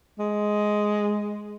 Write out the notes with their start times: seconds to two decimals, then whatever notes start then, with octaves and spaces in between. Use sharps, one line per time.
0.19 G#3